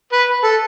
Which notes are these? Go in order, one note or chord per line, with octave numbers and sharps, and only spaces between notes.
B4
A4